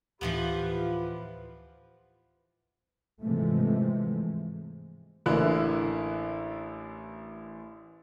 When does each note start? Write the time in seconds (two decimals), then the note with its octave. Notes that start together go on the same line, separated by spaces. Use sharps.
0.21 D2 A2 E3 F3 B3 F4 G4 B4
3.21 G#2 C3 E3 F3 G#3 A3
5.26 A1 D3 A#3 E4 F#6